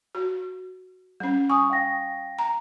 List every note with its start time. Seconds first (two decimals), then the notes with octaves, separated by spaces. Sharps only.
0.15 F#4
1.20 G3 C#4
1.50 G#5 C#6 D#6
1.70 F5 G5 A#6
2.39 A#5